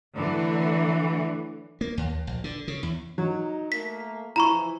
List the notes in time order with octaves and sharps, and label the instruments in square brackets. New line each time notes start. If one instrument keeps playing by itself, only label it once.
[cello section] D3 E3 F#3 A3
[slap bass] A#3
D#2
A#1
D3
C#3
E2
[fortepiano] F#3 [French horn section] D#4
[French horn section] A3 A#3 [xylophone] B6
[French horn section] C#3 E3 F3 [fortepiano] E4 [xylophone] A#5 B5 C#6